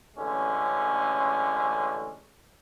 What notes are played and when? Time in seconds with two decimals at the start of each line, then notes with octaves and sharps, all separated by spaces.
0.17 A1 D3 G#3 C#4